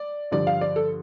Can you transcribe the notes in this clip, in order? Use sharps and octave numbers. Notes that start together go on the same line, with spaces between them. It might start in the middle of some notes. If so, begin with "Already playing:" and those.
Already playing: D5
G2 D3 F3 D5
F5
D5
A4